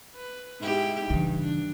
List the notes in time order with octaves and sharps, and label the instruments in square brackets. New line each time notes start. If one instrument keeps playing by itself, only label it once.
[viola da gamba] B4
G#2 E4 G4
[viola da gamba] G2 D#4 [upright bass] C#3 E3
[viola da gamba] D4